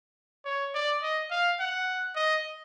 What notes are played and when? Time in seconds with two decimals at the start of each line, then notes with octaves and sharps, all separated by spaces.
0.45 C#5
0.74 D5
1.03 D#5
1.31 F5
1.60 F#5
2.16 D#5